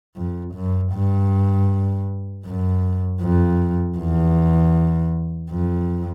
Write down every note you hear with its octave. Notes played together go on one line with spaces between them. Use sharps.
F2
F#2
G2
F#2
F2
E2
F2